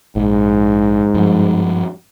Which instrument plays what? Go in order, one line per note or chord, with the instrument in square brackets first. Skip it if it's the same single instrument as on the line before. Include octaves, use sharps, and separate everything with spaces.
[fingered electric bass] A#1 [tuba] G#2
[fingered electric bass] G2 F3